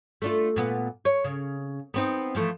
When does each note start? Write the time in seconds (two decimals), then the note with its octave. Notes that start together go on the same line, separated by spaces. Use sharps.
0.22 A3 D4 F4
0.56 A#2 B3
1.05 C#5
1.24 C#3
1.94 B3 C4 D#4
2.35 E3 F3 A3